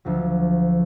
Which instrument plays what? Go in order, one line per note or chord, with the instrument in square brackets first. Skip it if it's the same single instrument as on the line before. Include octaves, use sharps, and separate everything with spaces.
[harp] D2 F3 F#3